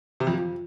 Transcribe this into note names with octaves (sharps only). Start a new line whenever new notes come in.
C3
F2
F3